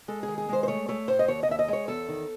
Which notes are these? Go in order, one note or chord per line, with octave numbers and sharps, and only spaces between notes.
G#3 A4
D#3 G#4
G#4
G#3 C5
C5
A3 C#5
A3 C#5
A2 C5
D#5
D#2 C#5
D#5
D#2 E5
D#5
G#3 C#5
E2 A4
D#3